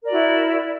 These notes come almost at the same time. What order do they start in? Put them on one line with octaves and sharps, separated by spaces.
A#4 D5 F#4 E4